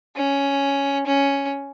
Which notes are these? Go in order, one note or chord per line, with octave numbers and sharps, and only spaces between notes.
C#4
C#4